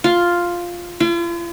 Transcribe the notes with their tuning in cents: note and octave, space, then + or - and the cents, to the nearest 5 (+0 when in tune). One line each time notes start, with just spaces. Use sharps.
F4 +0
F4 -45